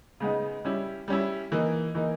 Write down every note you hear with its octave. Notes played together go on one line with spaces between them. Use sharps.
C#3 G#3 B3 D#4
G3 C#4 E4
G3 C#4 E4
E3 A#3 D#4
E3 A#3 D#4